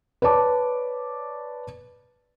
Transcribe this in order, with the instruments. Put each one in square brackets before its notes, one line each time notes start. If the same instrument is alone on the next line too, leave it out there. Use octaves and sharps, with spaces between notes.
[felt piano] B4 C#5 D5 A5 D6